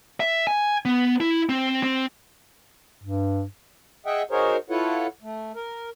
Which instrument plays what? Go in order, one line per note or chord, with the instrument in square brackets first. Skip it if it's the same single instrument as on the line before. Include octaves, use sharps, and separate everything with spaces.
[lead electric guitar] E5
G#5
B3
E4
C4
C4
[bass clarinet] G2
[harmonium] G#4 D#5 E5 F#5 G5
D#4 F#4 G#4 A#4 C5 C#5
E4 F4 A4 B4 C#5 F#5
A3
A#4